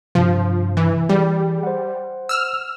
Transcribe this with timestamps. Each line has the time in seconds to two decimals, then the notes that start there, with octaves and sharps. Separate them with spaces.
0.15 G2 C3 F3
0.77 E3
1.09 E3 G3 G#4
1.63 C5 F#5
2.29 E6 F6